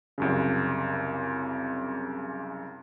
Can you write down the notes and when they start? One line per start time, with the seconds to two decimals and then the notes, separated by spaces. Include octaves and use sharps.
0.18 C2 F#2 C#3